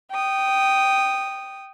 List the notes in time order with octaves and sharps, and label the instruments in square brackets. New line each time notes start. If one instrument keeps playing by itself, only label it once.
[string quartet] G5 D#6